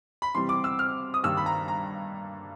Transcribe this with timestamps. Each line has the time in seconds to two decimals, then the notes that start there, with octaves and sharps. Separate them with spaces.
0.22 B5
0.35 C3 E3 G3 C4 C6
0.49 D6
0.64 E6
0.79 F6
1.14 D#6
1.23 G2 D#3 G3 A#3 E6
1.37 B5
1.46 A#5
1.68 A#5